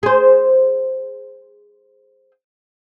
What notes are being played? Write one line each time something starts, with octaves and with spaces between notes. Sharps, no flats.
G#4 C5